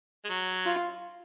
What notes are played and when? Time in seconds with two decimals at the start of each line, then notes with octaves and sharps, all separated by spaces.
0.25 G#3
0.29 F#3
0.65 F4